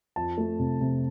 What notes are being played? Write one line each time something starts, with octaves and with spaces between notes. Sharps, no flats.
F2 A5
A3
C3
C3